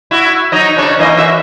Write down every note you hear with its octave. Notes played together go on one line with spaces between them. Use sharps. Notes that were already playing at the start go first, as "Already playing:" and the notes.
E4 F#4
F#3 D#4 D#5
C#3 D4 C#5
E3 A#3 D#5
F#4 E5